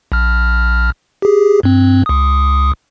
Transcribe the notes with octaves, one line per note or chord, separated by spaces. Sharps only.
A#1 F6
G4 G#4
G2 C4
C#2 D#6